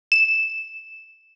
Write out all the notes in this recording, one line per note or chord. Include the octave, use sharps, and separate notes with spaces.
E7